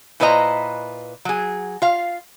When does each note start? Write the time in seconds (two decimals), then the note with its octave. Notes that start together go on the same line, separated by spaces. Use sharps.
0.20 A#2 E4 B4 C5 D#5 A#5
1.25 F#3 G#4
1.82 F4 F5